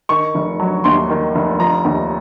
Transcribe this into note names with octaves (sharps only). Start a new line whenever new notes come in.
D#3 C#6
F1
F#3
D#2 C6
D#3
F1
F3 A#5
D#2